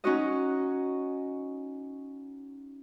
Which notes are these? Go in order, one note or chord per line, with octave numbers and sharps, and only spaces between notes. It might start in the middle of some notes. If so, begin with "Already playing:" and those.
C#4 D#4 F#4 D#5